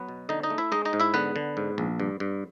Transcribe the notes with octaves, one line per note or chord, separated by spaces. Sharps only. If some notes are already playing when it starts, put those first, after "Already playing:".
Already playing: F#3 B3 B4
B2
D3 D#4 D#5
D#4 D#5
A3
E4 E5
G#3 D#4 D#5
D#4 D#5
G#2
E4 E5
D3 B3 B4
D3
G#2
A#1
G2
G2